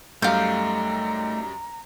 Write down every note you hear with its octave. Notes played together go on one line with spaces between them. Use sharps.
F#2 G3 A3 D#4 G4 F5 A#5 G6